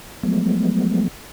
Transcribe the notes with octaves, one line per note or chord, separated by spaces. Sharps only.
F3 F#3 G#3 A3 B3